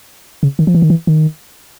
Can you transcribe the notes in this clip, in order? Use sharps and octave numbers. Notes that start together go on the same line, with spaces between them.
C#3
D#3
F3
E3
D#3
E3
D#3